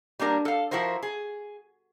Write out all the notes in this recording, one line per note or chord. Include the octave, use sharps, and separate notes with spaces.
G3 A#3 D4 A#4
A4 F5
F3 E4 F#4 A#4 C5
G#4